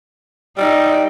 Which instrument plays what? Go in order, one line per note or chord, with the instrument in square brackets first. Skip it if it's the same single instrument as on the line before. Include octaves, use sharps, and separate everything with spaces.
[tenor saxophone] G3 [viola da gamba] D#4